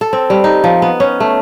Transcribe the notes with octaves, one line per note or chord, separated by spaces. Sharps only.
A4
C4
G3
D#4
F3
B3
C#4
A3